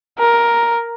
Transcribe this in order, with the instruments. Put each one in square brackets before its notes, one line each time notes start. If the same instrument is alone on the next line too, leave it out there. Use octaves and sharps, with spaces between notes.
[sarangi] A#4